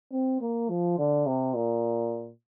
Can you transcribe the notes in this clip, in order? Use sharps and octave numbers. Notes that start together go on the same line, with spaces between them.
C4
A#3
F3
D3
C3
A#2